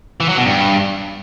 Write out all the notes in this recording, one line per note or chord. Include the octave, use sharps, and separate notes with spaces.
E3
F#3
B2
G2